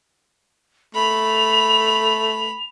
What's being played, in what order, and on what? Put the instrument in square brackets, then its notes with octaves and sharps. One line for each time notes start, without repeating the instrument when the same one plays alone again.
[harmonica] A3 [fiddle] B5 [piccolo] F7